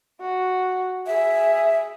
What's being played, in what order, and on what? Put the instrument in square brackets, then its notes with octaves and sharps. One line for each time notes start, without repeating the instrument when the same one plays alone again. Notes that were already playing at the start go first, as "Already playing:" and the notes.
[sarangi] F#4
[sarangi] G#4 [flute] E5